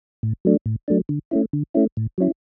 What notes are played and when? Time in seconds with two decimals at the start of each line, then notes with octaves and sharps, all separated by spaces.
0.23 A2
0.45 F#3 A3 D4
0.66 A2
0.88 F#3 A3 D4
1.09 D3
1.31 A3 C#4 E4
1.53 D3
1.74 A3 C#4 E4
1.97 A2
2.18 F#3 C#4 E4